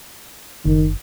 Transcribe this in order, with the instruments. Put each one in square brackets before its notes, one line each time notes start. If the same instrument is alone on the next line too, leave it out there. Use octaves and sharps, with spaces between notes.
[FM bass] F#1 [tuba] D#3